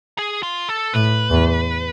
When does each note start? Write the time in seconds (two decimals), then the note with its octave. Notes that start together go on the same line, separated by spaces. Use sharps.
0.18 G#4
0.43 F4
0.69 A4
0.94 A2 B4
1.31 E2